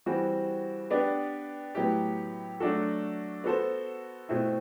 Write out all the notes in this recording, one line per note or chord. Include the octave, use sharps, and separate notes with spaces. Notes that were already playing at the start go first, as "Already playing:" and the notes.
E3 G3 C4 F#4
B3 D4 G4 B4 D5
A2 F#3 B3 E4 G4
F#3 A3 D4 F#4 A4
B3 F#4 A4 C5
B2 A3 C4 E4